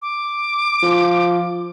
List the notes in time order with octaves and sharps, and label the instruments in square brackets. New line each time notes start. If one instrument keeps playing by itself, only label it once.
[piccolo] D6
[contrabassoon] F3